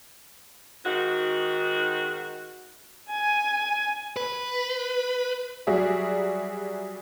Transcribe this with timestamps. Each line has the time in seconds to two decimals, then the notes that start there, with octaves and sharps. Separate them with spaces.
0.85 G#2 D#3 F#4
3.10 G#5
4.17 B4
5.67 F#3 G3 F#4 G#4 D5 E5